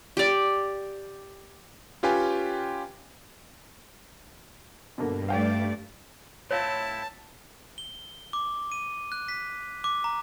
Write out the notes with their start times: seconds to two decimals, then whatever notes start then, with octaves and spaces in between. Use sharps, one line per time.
0.17 G4 D5
2.03 C#4 F4 G4 B4 G5 G#5
4.98 G2 B2 D3 A#3
5.29 A3 D5 F5 G5
6.51 A2 C4 E4 C#5 F5 A5
7.78 G7
8.33 D6
8.72 D#7
9.12 F#6
9.28 B6
9.84 D6
10.04 A#5